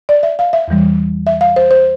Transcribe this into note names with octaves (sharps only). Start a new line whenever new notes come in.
D5
E5
F5
E5
E2 E3 G3
E5
F5
C5
C5